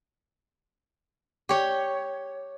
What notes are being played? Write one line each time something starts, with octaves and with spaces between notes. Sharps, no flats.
G4 C#5